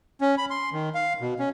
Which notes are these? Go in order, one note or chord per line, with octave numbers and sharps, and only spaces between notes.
C#4
B5
C6
D#3
F5
B2
C#4